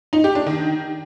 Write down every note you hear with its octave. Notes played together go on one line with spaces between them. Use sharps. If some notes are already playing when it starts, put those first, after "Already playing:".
D#4
G4
D4
D#3